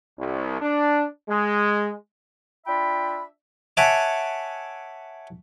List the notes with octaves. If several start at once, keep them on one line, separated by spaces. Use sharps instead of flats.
C2
D4
G#3
D4 F4 E5 G5 B5
C#5 E5 F#5 G#5 A5 D6